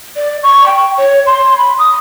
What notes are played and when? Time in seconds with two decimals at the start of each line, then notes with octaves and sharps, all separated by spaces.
0.16 D5
0.43 C#6
0.66 G5
0.98 C#5
1.27 C6
1.58 B5
1.79 D#6